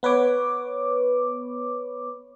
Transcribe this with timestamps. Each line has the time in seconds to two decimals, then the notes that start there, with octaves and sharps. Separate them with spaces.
0.03 B3 B4 C#5 D6